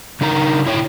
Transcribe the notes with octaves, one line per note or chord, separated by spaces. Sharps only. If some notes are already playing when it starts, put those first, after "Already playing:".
C#3 D#4 A#4 A#5
E4 C#5 G5